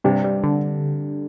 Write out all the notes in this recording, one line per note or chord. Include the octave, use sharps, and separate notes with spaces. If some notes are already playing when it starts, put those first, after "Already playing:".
G2 C3 D4
G3
D3